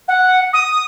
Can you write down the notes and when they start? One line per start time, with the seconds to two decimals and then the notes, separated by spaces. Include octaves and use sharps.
0.08 F#5
0.53 D#6